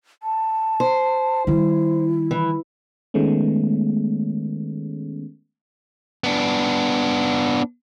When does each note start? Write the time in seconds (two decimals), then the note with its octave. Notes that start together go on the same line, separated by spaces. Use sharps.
0.23 A5
0.80 C5
1.47 D#3 G3 E4
2.31 E3
3.14 D#3 G#3 A3 B3 C#4
6.24 B3 D4